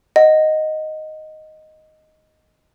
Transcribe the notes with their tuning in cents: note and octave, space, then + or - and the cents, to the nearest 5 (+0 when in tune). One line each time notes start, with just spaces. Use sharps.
D#5 +0 F#5 +0